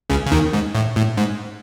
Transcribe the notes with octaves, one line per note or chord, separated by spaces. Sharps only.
C#2 C#3
C#3
D#2 D#3
G#2
A2
A2
G#2